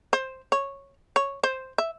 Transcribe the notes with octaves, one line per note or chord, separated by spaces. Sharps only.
C5
C#5
C#5
C5
E5